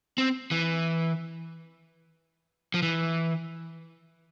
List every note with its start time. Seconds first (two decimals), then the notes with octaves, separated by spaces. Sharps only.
0.18 C4
0.51 E3
2.74 F3
2.82 E3